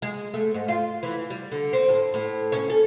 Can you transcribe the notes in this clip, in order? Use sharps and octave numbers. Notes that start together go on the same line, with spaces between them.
G#3
A3
G#2
F4
E3
G3
D3
C4
A2
A2
C#4
A4